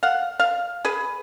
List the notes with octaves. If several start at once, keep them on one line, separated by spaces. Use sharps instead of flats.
F5 F#5
F5
G#4 B4